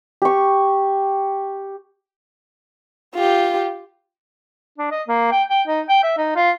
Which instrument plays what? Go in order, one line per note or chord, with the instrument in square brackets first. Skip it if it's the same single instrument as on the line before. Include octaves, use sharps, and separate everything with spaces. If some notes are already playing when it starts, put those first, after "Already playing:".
[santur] G4 C#6
[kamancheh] F4 G4
[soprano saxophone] D4
D#5
A#3
G5
G5
D#4
G5
E5
D#4
F4